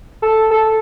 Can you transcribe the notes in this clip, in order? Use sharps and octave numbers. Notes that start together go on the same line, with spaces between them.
A4
A4